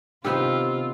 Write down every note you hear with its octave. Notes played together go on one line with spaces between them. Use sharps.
C3 D#3 B3 F4 G4 C5 E6